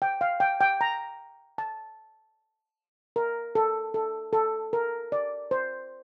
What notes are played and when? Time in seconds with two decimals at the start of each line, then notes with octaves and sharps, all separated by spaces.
0.02 G5
0.21 F5
0.40 G5
0.61 G5
0.81 A#5
1.58 A5
3.16 A#4
3.55 A4
3.94 A4
4.33 A4
4.73 A#4
5.12 D5
5.51 C5